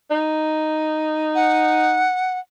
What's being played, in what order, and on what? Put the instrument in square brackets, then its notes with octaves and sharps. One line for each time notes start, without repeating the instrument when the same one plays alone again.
[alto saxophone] D#4
[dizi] F#5